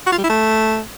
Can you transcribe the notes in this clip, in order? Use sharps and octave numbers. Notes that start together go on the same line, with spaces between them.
F#4
F4
G3
E4
A3